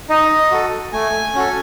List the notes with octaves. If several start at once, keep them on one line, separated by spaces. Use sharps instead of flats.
D#4 D#5
F#4 A4
A3 G#5
C#4 F#4 A4